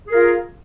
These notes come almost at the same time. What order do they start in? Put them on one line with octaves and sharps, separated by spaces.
G#4 A#4 F4